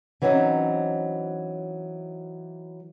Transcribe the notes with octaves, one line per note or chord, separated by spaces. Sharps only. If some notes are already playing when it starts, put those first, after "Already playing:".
E3 F#3 C4 C#4 D#4 C5